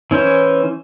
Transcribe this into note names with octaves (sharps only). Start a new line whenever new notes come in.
E3 C#4 C5